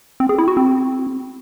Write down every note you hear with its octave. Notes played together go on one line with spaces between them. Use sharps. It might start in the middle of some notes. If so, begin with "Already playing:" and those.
C4
G#4
E4
F#4
C4